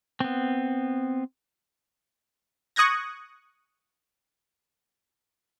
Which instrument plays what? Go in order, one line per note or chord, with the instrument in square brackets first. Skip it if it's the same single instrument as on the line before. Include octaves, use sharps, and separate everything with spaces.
[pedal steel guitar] B3 C4
[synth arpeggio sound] C#6 D#6 F#6 G#6 A#6